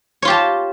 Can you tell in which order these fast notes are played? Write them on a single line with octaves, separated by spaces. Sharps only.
C#5 F4 G4 A5